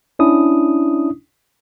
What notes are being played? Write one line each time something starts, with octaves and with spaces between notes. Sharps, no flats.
C#4 D4 E4 D#6